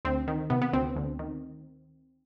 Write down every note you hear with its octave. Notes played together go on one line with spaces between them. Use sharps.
D2 C4
D#3
C3 B3
B3
D2 C4
D2
D#3